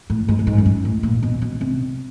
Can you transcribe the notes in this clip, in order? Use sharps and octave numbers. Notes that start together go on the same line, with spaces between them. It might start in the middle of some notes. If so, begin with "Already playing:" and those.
A2
G#2
A2
G#2
F#2
G2
A2
A#2
B2
B2
C3